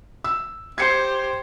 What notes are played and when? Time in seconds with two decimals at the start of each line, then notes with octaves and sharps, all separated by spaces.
0.24 E6
0.78 G4 C5 G#6 C7 C#7